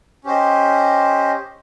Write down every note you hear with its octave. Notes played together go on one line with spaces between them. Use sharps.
C#4 G4 C5 D#5